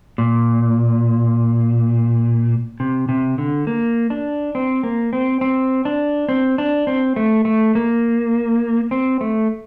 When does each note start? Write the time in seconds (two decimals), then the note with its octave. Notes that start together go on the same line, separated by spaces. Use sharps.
0.18 A#2
2.80 C3
3.09 C3
3.38 D3
3.67 A#3
4.10 D4
4.55 C4
4.83 A#3
5.13 C4
5.41 C4
5.85 D4
6.29 C4
6.58 D4
6.87 C4
7.16 A3
7.45 A3
7.75 A#3
8.91 C4
9.21 A3